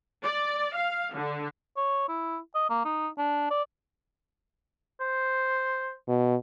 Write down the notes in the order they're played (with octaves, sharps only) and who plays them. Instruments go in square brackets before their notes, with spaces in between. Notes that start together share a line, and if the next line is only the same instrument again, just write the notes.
[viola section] D5
F5
D3
[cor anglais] C#5
E4
D#5
A#3
D#4
D4
D5
[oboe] C5
[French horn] B2